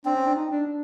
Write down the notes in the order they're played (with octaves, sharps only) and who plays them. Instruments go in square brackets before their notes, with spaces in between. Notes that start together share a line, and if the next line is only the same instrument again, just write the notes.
[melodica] C4 [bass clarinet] D4
[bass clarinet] C#4
D4
D#4
D4
D4